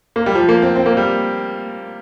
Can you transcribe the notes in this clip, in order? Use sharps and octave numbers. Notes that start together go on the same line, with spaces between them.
A#3
G3
F3
A#3
C4
C4
A#3
G3